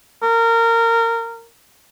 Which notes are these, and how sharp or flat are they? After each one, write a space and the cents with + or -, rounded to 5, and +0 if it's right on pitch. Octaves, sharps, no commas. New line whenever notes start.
A#4 -20